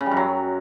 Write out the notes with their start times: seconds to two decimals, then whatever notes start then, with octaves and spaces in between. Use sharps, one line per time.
0.01 C#3
0.06 G3
0.11 F#2
0.17 F#3